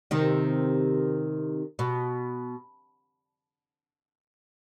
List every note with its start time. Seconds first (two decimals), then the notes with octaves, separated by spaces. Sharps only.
0.11 C3 D#3
1.79 B2